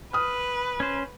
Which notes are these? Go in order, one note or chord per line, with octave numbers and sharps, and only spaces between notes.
B4 D#6 F6
C#4 C5